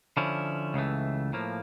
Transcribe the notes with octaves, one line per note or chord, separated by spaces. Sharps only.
D3 F3 C#4 E4
C#2 C#3 E3 A3
A2 F3 A#3